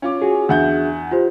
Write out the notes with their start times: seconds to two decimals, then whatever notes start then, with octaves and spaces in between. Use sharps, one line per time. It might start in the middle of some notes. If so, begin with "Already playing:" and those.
0.02 C#4 F4 D6
0.22 F#4 G#4 G#5
0.49 E2 D4 E5 F#5 G6
1.11 F4 G4 C5